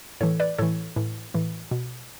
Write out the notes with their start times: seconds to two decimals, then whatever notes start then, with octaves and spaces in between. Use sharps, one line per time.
0.21 A2 E3 A4 C#5
0.40 B4 D5
0.58 A2 E3 A4 C#5
0.96 A2 E3
1.34 A2 E3
1.71 B2